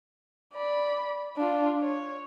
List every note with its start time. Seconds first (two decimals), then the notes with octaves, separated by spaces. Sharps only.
0.54 D5 B5
1.37 D4 F4
1.82 C#5